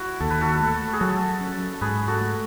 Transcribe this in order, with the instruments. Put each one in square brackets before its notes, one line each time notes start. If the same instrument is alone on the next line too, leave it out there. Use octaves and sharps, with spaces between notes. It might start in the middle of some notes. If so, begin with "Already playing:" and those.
Already playing: [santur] E4 F#4
[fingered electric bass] D#2 [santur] A4
[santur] B4
F#4 A4
[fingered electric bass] A3
[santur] G#4
[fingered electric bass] F#3 [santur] F#4 A4
[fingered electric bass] C#4
[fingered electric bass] G#2 [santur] G#4 B4
[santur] F#4 A4
[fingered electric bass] A3